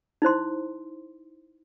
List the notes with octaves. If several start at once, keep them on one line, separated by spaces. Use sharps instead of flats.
D#4 E4 C5 C6